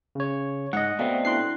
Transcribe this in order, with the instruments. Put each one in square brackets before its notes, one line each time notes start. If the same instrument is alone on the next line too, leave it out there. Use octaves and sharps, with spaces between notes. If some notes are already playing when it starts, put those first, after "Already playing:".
[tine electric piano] C#3 C#5
[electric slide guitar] G#2 [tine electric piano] D#5 F#5
[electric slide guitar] B2 A3 C4 [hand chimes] D5 F5 G5
[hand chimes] D4 E4 [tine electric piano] C6 F#6 C7